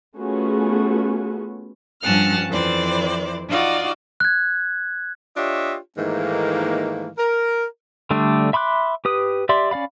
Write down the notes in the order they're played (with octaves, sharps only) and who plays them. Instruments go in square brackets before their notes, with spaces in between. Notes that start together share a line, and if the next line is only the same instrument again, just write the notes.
[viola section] A3 B3 C#4 F4 F#4 G#4
[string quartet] G2 F3 C#4 F#5 A5 F6
F2 E3 C5 D5
D#4 F4 F#4 D5
[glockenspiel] F#6 G#6
[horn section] D4 F4 G4 C#5 D#5 E5
G#2 D#3 E3 A3 A#3
A#4
[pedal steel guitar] D3 G3 A3 D4
E5 B5 C6 D6 F#6
G4 B4 D#6
G4 D5 E5 C6
C#4 D5 F5 B5